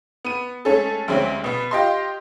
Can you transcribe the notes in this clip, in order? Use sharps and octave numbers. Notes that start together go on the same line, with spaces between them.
B3 D#7
G#3 A3 C#4 G#4 A4
D2 G3 G#3 C4 C#4
B2 B3
F4 G4 D#5 C6